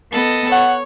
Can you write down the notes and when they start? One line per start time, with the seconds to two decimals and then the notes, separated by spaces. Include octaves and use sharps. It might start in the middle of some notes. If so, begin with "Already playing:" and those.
0.11 B3 A4 D#5
0.52 C#5 F#5